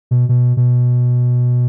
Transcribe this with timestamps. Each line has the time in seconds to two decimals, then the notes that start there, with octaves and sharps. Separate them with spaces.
0.11 B2
0.29 B2
0.57 B2